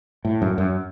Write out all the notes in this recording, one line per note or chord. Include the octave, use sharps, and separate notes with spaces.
A2
F#2
F#2